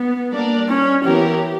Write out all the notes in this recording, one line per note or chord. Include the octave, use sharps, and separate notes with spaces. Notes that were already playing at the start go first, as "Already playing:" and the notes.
Already playing: B3
G3 A#3 D4 A#4 D5
C#4
E3 B3 E4 G4 A#4 C#5